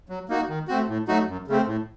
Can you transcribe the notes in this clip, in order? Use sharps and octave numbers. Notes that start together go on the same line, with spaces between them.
F#3
A#3 D#4 F#4
D#3
A3 C4 F#4
A2
F#3 A3 D#4 F#4
F#2
C#3 A3 C4
A2